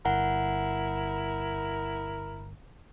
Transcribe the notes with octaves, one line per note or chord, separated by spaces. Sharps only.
G1 E4 A#4 F#5